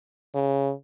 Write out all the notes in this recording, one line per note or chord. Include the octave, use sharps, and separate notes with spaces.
C#3